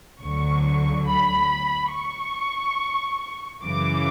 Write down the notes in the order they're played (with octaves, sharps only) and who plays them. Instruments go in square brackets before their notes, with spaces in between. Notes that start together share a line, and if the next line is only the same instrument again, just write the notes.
[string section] D2 D3 F#3 C#6
B5
C#6
F#2 C#3 E3 D6